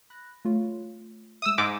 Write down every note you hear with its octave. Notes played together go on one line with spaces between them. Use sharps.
B5 F#6 A#6
A3 F4 C#5
G#3 E5 D#6 E6
G#2 D6